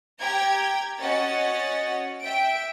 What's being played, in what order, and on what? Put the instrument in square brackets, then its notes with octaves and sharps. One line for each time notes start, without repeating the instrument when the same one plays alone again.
[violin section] G4 G5 A#5 G#6
C#4 F#4 C#5 D#5 A6
E5 G5 D7